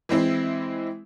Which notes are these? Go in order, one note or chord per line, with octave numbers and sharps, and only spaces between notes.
E3 G#3 C4 E4